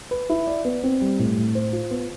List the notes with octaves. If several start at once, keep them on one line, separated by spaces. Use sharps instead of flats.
B4
E4
D5
B3
C4
G3
A2
A2
C5
F4
B3